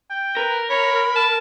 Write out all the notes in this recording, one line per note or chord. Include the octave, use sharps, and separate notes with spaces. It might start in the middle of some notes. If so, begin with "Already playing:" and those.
G5
A#4 B4
C#5 B5
A5